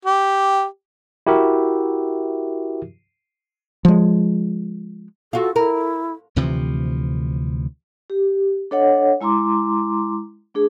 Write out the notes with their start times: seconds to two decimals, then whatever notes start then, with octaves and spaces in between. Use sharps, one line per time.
0.05 G4
1.27 E4 F#4 G4 A#4 E5
3.85 F3 G#3
5.33 F4 F#4 A4
5.56 E4 A#4
6.36 D2 C3 E3 F3
8.10 G4
8.71 D4 A4 C#5 D#5 F#5
9.21 G#3 E4 A#5 C6 D6
10.54 A3 D4 G#4